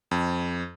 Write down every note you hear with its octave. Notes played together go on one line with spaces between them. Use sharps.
F2